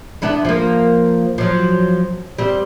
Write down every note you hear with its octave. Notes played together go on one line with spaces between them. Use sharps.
B3 D4 E4
F3 A#3
F3 F#3
G3 C4